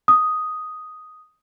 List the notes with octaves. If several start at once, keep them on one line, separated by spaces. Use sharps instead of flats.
D#6